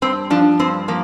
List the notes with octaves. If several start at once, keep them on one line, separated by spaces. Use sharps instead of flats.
G2 C4
F3 D4
G2 C4
F3 A#3